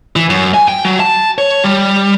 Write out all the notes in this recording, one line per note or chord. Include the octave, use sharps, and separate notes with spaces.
E3
F#2
G#5
G5
F#3
A5
C#5
G3